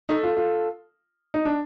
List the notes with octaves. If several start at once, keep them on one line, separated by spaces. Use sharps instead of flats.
A3 D4 D#4 A4
F4
F4
D#4
D4